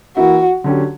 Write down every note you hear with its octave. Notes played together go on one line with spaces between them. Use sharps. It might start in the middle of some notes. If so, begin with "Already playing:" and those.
E3 A#3 E4 F#4
D3 F#3 C#4 G4